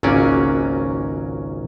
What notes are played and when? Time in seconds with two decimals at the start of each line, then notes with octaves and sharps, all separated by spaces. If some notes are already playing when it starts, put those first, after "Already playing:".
0.03 G#1 C#2 F#3 A#3 C#4 D5